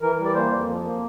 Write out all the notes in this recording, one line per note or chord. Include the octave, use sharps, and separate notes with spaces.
E3 A#4
G3
D5
A#3 C5
F2
F3
A#3